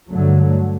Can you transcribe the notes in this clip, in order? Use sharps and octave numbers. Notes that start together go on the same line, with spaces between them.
G2 D3 F#3 A3